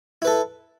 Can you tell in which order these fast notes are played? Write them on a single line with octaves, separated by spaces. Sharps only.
E4 B4 A4